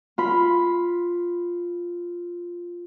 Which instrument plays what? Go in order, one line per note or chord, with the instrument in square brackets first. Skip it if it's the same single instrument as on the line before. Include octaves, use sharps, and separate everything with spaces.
[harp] F4 B5